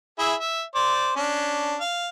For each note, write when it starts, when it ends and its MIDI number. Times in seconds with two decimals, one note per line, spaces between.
0.19 0.34 64
0.19 0.34 68
0.19 0.34 76
0.40 0.62 76
0.75 1.15 72
0.75 1.15 74
1.17 1.77 61
1.17 1.77 62
1.81 2.08 77